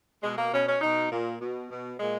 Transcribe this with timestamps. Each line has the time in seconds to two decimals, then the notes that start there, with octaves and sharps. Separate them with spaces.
0.23 B2 G#3
0.37 A#3
0.52 B2 C#4
0.67 C#4
0.81 B2 D#4
1.11 A#2
1.41 B2
1.70 B2
1.99 A#2 G#3